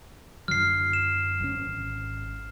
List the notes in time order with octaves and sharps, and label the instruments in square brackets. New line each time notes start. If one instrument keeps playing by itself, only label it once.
[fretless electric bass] F#2 D3 F#3 [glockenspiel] F6 C7
[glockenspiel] E7
[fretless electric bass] G#1 D#3 C#4